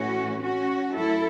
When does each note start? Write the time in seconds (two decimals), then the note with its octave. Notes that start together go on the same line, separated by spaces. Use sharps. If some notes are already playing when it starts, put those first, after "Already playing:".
Already playing: A2 E3 A3 C#4 F#4
0.43 C#4 F#4
0.95 F#2 F#3 A3 E4 A4